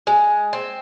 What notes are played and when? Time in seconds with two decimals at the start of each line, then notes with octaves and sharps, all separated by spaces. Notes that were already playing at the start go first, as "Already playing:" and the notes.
0.07 G#3
0.53 C4